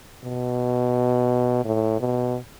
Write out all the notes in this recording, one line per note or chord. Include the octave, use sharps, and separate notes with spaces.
B2
A2
B2